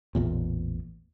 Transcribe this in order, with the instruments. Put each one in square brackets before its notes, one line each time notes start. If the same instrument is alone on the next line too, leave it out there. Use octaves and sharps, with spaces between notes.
[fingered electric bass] A1 E2 A#2